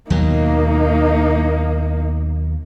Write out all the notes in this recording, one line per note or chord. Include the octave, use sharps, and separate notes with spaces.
D#2 B2 F#3 A#3 D#4